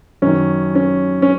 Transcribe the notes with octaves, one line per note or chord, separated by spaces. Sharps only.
F#2 D#3 C#4
C#4
C#4